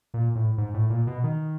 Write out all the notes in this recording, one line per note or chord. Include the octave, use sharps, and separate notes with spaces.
A#2
A2
G#2
A2
A#2
B2
D#3